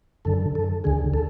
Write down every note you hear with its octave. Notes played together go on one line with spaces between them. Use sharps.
F#2 D3 A4
A4
D2 D3 G#4
A4